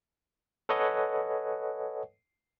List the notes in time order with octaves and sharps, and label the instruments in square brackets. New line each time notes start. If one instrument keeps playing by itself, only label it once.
[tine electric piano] A4 B4 C#5 D#5 F#5 G#5